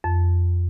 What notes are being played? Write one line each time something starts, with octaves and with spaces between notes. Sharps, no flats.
F2